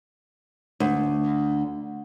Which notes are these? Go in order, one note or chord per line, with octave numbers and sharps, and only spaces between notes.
D2